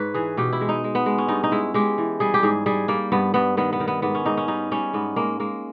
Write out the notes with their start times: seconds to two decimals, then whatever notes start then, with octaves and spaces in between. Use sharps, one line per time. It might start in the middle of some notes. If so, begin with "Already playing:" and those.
Already playing: G#2 B4 C#5
0.14 E3 G#4
0.37 B2 G4
0.53 E4
0.61 G#3
0.69 D#4
0.84 G#3
0.95 B3
1.06 G#3
1.18 C#4
1.28 G2 D#4
1.44 D#4
1.52 G#3 E4
1.74 G#3 G4
1.98 E3
2.20 G3 G#4
2.34 G4
2.43 G#2 G#4
2.66 G3 G#4
2.88 G3 A#3
3.12 G2 B3
3.34 G2 B3
3.57 D#3 B3
3.73 B3
3.80 D#3
3.88 B3
4.02 G#2 B3
4.15 C#4
4.25 G#2 D#4
4.37 C#4
4.48 G3 D#4
4.71 G3 C#4
4.93 G#2 B3
5.16 G#3 A#3
5.40 G#3 A#3